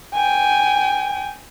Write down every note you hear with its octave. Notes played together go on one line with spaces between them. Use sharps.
G5 G#5